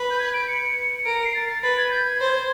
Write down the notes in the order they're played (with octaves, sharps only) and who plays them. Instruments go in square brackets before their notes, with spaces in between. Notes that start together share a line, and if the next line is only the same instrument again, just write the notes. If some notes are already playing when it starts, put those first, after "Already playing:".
Already playing: [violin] B4
[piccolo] G6
G#6
D7
C#7
[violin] A#4 [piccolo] D7
[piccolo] C7
A6
A6
[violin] B4 [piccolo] A6
[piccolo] G#6
G6
G#6
[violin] C5